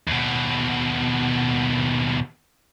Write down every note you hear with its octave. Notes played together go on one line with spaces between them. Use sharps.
D#2 B2